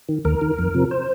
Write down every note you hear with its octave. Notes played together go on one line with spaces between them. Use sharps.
D#3
D#2 A#4
D#3
F2
C3 F3
C5